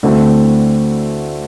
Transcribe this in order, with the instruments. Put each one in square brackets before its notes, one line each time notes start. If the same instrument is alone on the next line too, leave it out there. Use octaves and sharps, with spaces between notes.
[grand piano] D2 D3 A3 C4 E4